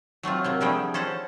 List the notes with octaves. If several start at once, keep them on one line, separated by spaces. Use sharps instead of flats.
F#3 A3 C4 F4
C3 A#3 C4
D3 F3 G3 A3 G#4 G5
C#4 A4 C5 F#5